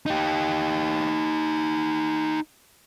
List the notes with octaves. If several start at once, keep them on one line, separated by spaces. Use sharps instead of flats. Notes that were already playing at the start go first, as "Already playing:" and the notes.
D#4 G4